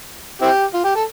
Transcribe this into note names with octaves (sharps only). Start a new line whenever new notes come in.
C4 E4 G4
F4
G4
A4